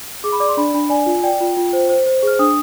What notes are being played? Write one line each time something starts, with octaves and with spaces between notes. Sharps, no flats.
G#4 D6
B5
D5 D6
C6
D4 B5
D4 B5
D5 G#5
F4
D5 G5
F4
F4
C5
C5
C5
G#4 F6
D4 D#6